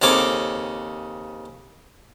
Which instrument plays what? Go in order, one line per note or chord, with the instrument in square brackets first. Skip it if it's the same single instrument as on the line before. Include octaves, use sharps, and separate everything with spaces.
[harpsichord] D#2 C#3 C4 A4 C#5 D6